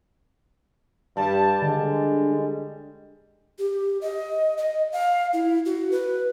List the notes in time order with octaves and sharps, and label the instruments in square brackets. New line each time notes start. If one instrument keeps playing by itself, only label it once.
[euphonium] G2 [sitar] G3 [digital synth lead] A5
[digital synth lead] D3 [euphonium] G#3
[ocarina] G4
D#5
D#5
F5
E4
F#4
B4